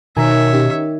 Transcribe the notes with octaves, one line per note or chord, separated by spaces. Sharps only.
B2 D#3 C#5 E5 G#5 A#5
C#4 D#4 G4